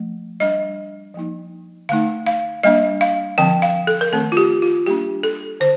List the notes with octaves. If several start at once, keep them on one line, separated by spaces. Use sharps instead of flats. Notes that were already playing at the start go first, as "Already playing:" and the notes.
Already playing: F3 A3
G3 D4 D#5
F3 A#3 D#4
D3 A3 D#4 F5
F5
G3 A#3 D4 D#5
F5
D3 F3 C4 G5
F5
A4
A#4
D#3 A3 C4 A4
F4
G4
F4
G3 A#3 D4 G4
A4
D3 C5